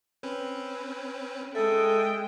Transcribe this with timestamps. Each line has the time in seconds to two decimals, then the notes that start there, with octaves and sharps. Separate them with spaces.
0.23 C4 C#4 B4
1.55 G#3 A4 E5 G5 D#6